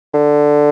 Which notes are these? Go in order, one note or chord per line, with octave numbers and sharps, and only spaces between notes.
D3